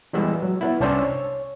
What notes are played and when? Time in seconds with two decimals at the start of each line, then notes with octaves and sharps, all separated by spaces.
0.13 E3 G3 G#3 B3 D5 E6
0.42 F#3
0.61 B3 E4
0.80 C2 C#4 D4 C5 D5 E6
1.02 C#5